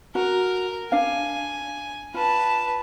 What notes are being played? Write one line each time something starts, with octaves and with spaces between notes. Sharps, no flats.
F#4 A#4
D4 F5 G#5
F4 B4 A5